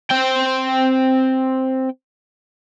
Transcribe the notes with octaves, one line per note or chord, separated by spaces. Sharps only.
C4 G5